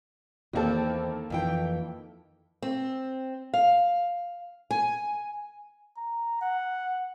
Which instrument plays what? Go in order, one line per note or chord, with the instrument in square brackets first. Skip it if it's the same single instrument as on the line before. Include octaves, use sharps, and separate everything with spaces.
[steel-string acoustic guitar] E2 C4 [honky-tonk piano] D#3 A#3 A4
[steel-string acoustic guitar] F2 E3 G5
C4
F5
G#5
[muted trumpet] A#5
F#5